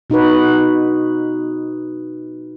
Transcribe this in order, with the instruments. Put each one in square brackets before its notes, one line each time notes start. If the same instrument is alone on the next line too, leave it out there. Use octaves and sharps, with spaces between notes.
[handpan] B2 D#4 F#4 B4